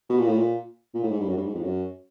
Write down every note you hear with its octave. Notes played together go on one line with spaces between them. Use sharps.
B2
A#2
A2
A#2
A#2
A2
G#2
G2
F#2
G2
G#2
F2
F#2